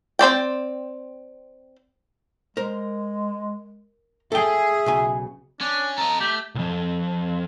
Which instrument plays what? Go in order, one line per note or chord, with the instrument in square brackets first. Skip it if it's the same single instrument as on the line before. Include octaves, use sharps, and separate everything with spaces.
[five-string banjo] C4 C5 D5 G5
[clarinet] G#3 [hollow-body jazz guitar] A#4 C5
[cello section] G#4 [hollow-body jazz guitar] A4 G5 [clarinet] E5
[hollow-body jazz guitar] B1 C#3 G#5
[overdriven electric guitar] C#4 [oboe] D4
[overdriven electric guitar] A4 D#5 [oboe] A#5
[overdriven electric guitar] A3 [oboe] G4
[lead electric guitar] C2 F2